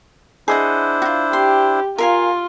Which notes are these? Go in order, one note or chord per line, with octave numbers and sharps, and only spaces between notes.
D4 E4 G#4 C5 D#5 F#5
F4 F#4
G4 C6
F4 A#4 F5 G#5